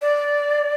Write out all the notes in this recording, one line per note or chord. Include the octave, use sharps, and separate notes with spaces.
D5